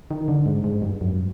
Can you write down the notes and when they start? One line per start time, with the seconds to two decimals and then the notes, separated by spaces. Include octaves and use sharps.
0.11 D#3
0.28 D3
0.46 G#2
0.64 G#2
0.82 G2
1.01 F#2